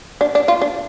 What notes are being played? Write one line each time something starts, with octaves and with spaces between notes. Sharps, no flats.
D4
D4
F4
D4